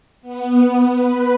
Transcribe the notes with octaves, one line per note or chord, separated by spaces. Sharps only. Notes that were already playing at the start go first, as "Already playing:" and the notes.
B3
B4